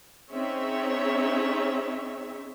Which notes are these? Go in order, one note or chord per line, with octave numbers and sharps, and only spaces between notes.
C4 C#4 D#4 G#4 C#5 E5